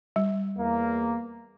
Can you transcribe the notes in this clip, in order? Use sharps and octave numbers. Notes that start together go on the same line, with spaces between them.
G3
E2 A#3